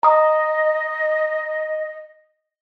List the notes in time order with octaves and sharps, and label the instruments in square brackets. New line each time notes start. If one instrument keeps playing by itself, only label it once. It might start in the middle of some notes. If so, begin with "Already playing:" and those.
[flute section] D#5 [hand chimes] A#5 D#6